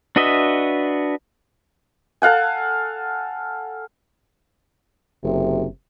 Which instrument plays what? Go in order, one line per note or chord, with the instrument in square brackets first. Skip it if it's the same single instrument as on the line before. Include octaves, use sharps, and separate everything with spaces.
[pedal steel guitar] D4 F#4 B4 D#5 E5
[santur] A4 F5 F#5 G#5
[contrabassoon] F#1 [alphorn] C3